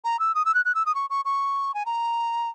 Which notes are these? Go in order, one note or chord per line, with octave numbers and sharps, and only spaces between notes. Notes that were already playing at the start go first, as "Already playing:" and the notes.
A#5
E6
D#6
E6
F#6
F#6
E6
D#6
C#6
C#6
C#6
G#5
A#5